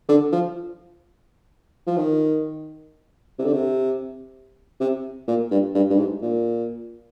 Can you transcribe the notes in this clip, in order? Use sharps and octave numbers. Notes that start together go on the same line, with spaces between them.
D3
F3
F3
D#3
C3
D3
C3
C3
A#2
G2
G2
G2
G#2
A#2